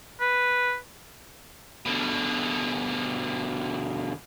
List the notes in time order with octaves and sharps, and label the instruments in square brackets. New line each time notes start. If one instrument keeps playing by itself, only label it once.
[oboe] B4
[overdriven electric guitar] B2 D3